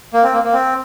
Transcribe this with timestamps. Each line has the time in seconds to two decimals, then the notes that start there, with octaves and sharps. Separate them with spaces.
0.13 A#3
0.23 C4
0.33 A#3
0.44 A#3
0.53 C4